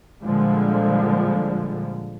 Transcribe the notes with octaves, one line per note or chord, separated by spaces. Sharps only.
A#2 D3 F3 G3 G#3